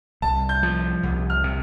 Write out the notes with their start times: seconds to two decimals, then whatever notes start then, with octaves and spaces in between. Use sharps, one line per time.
0.22 C2 A5
0.49 G6
0.63 F3
1.03 C2
1.30 F6
1.44 C3